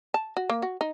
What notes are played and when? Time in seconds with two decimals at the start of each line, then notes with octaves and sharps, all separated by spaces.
0.14 A5
0.37 F#4
0.50 A#3
0.62 F#4
0.81 D#4